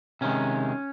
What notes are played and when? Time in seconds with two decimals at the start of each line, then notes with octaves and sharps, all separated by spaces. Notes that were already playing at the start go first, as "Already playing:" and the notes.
0.21 C3 D#3 G#3 C#4